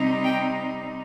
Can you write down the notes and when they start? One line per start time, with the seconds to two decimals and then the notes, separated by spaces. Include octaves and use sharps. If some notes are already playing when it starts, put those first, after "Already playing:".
Already playing: C3 G3 C4 D#4
0.23 G5